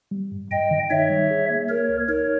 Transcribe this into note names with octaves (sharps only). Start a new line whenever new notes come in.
G3
G2
G2 D#5 G5
D#3
D#4 C#5 E5
G3
G#4
A#3
A#3 A#4 C#5
C#2
D#4 A#4 C#5